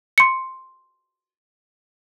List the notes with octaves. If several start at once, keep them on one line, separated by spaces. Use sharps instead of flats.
C6 C#7